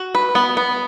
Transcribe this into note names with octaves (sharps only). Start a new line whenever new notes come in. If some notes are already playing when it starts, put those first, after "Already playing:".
Already playing: F#4
B4
B3
B3